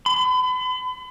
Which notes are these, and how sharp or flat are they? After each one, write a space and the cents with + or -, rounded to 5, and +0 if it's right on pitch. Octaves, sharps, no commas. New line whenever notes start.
B5 +40